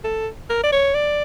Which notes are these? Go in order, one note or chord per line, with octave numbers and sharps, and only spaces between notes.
A4
A#4
D5
C#5
D5